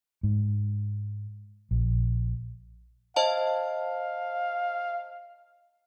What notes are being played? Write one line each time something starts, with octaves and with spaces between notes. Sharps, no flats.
G#2
A#1
C5 D#5 F5 A5